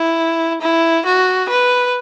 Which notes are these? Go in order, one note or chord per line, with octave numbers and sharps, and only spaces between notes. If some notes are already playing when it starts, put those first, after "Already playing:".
Already playing: E4
E4
F#4
B4